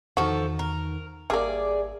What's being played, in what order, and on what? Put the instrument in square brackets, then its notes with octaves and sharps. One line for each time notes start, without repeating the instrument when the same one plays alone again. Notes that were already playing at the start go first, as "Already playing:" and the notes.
[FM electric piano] E2 D#3 D#4 [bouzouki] F3 A4 [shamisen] F#4
[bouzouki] A#4
[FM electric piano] G#1 E5 [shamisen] G3 A#3 [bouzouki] G#4 D5